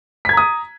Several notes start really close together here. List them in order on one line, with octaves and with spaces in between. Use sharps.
B6 G#6 A#5 D#6